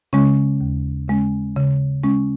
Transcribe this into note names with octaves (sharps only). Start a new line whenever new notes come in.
C#3 G#3 C#4
D#2
C#3 G#3 C#4
C#3
G#3 C#4